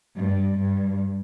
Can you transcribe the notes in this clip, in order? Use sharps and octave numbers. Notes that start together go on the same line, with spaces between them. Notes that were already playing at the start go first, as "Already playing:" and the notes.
G2
G2